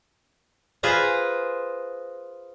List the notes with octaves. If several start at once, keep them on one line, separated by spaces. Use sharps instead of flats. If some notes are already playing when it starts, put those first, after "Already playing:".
F4 G#4 B4 C5 A#5